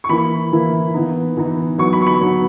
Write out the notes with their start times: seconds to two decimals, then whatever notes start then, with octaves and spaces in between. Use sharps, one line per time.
0.04 C#6
0.09 E3 A#3 E4 B5
0.52 E3 A#3 E4
0.94 E3 B3 D#4
1.37 E3 B3 D#4
1.78 F#3 B3 D#4 C#6
1.93 B5
2.02 C#6
2.07 B5
2.21 F#3 B3 D#4